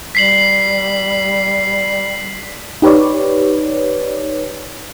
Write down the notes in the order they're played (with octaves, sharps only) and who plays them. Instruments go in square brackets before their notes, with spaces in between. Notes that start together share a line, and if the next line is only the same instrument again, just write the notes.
[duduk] G3 [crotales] B6 C7 F#7
[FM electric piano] D#4 G4 B4 C#5 D5